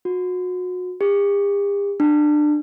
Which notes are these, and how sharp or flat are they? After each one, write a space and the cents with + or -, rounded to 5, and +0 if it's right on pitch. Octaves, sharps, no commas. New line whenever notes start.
F#4 -30
G4 +45
D4 +25